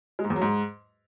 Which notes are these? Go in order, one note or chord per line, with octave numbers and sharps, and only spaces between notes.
G#3
G#2
E2
F#3
G#2